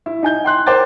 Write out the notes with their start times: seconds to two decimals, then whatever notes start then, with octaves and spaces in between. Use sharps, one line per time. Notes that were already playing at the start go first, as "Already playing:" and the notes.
0.06 E4
0.23 D#4 G#5 G6
0.44 G5 C6 F#6
0.66 A#4 C5 G5 D6 A6